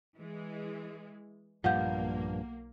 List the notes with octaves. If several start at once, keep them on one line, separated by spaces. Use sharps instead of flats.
E3 G#3
B1 G2 A#2 F3 A#3 F5 F#5 G6